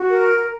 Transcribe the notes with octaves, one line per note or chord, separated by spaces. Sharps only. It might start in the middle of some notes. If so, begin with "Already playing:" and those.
Already playing: F#4
A#4